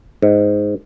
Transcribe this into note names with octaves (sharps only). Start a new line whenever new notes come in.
G#2